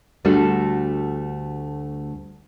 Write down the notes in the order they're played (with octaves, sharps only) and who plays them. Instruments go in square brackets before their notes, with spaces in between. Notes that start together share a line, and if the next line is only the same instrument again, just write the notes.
[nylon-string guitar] D2 G3 A3 D4 F#4 A4